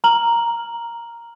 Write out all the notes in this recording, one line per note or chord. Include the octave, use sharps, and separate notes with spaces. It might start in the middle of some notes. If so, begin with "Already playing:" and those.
A#5 F6 F#7